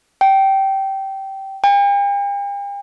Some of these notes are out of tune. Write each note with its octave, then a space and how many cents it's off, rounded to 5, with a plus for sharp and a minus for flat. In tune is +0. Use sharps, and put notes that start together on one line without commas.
G5 -15
G5 +45